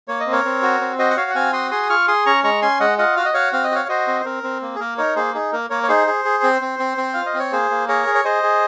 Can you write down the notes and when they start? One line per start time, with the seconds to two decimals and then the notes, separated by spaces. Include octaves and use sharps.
0.08 A#3 C#5
0.20 D#5
0.26 C4
0.32 A#4 C#5
0.45 C4
0.62 F#4
0.81 C4
0.99 F#4 C5 D#5
1.10 F#5
1.17 F#4 C#5 F5
1.30 F#5
1.35 C4 F5 G#5
1.53 F#4 C6 D#6
1.71 G#4 C6 D#6
1.83 D#6
1.89 F4 C#6 F6
2.08 G#4 C6 D#6
2.26 C#4 A#5 C#6
2.44 G#3 A#5 C#6
2.62 C#4 G#5 C6
2.80 G#3 D#5 F#5
2.98 F4 D#5 F#5
3.17 F#4 F5
3.25 D#5
3.34 F#4 C#5 F5
3.53 C4 F5
3.64 D#5
3.71 F#4 C#5 F5
3.89 F#4 C5 D#5
4.07 C4
4.21 C5
4.25 C4 A#4
4.43 C4
4.62 A#3
4.75 G#4
4.80 A#3 A#4
4.98 D#4 A#4 C#5
5.16 A#3 G#4 C5
5.34 D#4 G#4
5.52 A#3 A#4
5.70 A#3 A#4 C#5
5.83 C#5
5.88 D#4 G#4 C5
6.07 G#4
6.25 G#4
6.43 C4
6.61 C4
6.79 C4
6.98 C4
7.14 F4 F5
7.26 D#5
7.34 C4
7.39 C#5
7.52 A#3 G#4 C5
7.71 A#3
7.88 G#4 A#4 C#5
8.07 G#4
8.15 C#5
8.24 G#4 C5 D#5
8.43 G#4